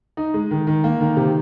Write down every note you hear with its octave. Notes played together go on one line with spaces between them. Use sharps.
D#4
G#3
D#3
D#3
A#3
D#3
C3